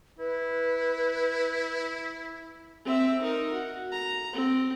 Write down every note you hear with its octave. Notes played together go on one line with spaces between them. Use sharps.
E4 B4
C4 E5
D#4 A#4
F#4
A#5
C4